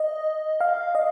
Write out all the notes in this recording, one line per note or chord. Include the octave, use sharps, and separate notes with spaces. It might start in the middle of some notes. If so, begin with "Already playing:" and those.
Already playing: D#5
F5
D#5